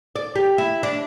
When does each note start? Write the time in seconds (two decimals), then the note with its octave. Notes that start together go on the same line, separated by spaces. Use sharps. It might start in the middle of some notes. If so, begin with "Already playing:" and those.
0.16 D5
0.36 G4
0.58 E4
0.83 D4